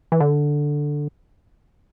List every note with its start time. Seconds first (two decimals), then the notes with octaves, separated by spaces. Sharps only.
0.12 E3
0.20 D3